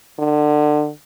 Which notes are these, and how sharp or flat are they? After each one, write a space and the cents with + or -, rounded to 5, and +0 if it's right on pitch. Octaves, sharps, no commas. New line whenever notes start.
D3 +25